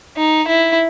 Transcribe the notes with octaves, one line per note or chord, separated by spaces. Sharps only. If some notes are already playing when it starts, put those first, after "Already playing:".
D#4
E4